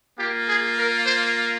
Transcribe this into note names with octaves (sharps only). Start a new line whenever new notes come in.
A#3 F4 G4
G#4
A#4
C5